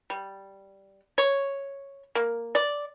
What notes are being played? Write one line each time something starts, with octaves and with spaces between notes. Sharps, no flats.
G3
C#5
A#3
D5